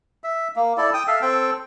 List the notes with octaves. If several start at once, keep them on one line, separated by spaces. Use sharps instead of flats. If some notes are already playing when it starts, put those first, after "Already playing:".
E5
A#3
E4 A4 D5
G5 D#6
A4 E5 F5
C4 A4 G5